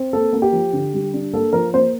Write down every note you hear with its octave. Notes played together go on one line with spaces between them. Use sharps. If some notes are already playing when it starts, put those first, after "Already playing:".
Already playing: C4
A#3 A4
A#3
G4
F3
D3
G3
D4
A#3 A4
F3 A#4
A#3 C5